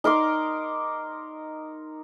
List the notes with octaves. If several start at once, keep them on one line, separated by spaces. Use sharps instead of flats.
D#4 A#4 C6 D6